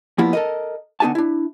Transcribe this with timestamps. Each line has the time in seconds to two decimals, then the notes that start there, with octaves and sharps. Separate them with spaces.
0.18 F3 G3 A#3 B3 E4
0.33 A4 A#4 D#5
1.00 D3 B3 D#4 G4 G#5 A5
1.15 D4 E4